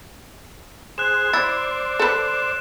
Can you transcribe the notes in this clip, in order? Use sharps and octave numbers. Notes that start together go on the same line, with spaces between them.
G#4 C5 F#6 E7
E4 C5 D5 E6 A6
A4 B4 E7